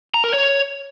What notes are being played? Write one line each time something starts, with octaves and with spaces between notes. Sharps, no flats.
A#5
A#4
C#5